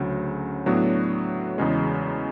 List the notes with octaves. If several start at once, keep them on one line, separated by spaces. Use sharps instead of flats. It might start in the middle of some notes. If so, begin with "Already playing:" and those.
Already playing: D2 C#3 F#3
A2 F#3 B3 D4 F#4
E2 C#3 G#3